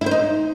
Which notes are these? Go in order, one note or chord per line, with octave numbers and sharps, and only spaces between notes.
E4
C5
D#4